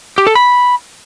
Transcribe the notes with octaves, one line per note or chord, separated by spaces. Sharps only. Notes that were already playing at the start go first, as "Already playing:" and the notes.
G4
A4
B5